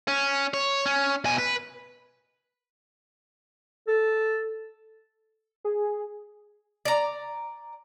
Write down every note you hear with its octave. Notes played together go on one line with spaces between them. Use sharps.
C#4
C#5
C#4
B2 G#5
B4
A4
G#4
D5 A#5